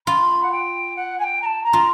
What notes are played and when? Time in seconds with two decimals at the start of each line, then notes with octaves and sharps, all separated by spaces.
0.07 F4 B5
0.42 F#5
0.51 G5
0.96 F#5
1.19 G#5
1.23 G5
1.41 A#5
1.45 A5
1.63 A#5
1.73 F4